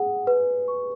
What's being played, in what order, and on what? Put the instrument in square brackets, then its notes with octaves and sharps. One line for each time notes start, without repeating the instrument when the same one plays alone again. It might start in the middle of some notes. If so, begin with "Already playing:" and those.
Already playing: [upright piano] G#4 [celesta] F#5
[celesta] B4
C#6